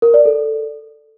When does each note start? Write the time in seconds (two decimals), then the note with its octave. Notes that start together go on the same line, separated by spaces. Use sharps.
0.02 A#4
0.14 D5
0.25 A4